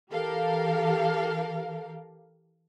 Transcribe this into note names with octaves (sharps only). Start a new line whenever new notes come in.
E3 G4 A4 A#4 F5